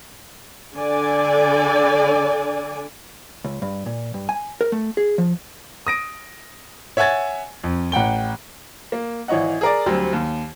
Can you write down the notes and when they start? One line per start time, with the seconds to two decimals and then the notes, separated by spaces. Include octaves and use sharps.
0.75 D3 A4 D5 G#5
3.45 C#2
3.62 G2
3.86 A#2
4.14 G2
4.29 G#5
4.61 A#4
4.72 A3
4.97 G#4
5.18 F3
5.87 D#6 A#6 D7
6.97 C#5 E5 F#5 G#5 G#6 A6
7.64 F2
7.92 A1 F#5 G5 G7
8.92 A#3
9.28 G#1 E3 C#5 D#5 F#5
9.61 G#4 A#4 D5
9.86 D2 F#3 G3 C4
10.13 D#2